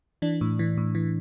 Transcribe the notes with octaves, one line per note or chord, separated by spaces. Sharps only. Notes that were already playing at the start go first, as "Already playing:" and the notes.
E3 D4
A2
E3
A2
E3